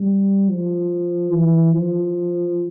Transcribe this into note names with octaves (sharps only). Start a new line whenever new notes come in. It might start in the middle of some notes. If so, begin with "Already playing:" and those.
Already playing: G3
F3
E3
F3